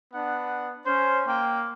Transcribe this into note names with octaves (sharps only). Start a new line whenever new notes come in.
B3 D4 F#5
C#4 C5
A#3 G5